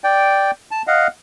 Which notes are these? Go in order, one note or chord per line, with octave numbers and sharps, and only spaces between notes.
D5 G5
A5
D#5 F5 F#5